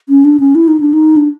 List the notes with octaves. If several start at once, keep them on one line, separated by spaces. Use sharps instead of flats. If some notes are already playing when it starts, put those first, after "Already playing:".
C#4
D4
C#4
E4
D#4
D4
D#4
D4